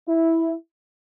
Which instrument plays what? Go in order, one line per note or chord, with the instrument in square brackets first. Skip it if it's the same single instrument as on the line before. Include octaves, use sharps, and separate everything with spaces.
[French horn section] E4